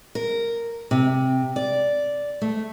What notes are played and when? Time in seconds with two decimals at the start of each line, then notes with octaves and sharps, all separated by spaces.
0.15 A#4
0.91 C3
1.56 D5
2.42 A3